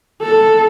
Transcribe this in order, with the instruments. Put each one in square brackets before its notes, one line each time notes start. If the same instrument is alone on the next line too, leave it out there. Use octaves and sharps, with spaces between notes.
[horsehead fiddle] A4